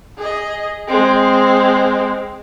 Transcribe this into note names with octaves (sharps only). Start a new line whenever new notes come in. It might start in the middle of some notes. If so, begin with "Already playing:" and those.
G#4 D#5
G#3 C4